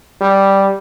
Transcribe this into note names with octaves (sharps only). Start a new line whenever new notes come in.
G3